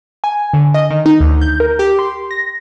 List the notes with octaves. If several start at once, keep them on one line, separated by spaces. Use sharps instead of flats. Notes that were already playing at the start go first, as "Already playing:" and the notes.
G#5
D3
D#5
D#3
D#4
D2
G6
A#4
G4
C6
A#6